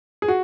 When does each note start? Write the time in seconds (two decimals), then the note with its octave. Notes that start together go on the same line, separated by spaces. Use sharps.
0.22 G#4
0.28 F#4